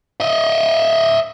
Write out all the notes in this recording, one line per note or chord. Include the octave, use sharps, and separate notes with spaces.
D#5 E5